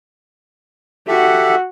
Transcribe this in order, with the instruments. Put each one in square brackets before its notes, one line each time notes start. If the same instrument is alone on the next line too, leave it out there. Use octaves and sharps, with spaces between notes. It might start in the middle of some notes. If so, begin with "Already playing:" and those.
[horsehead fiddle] F#4 F#5 [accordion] G4 A4 E5